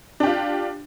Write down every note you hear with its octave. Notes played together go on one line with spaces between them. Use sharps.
D4 F4 G4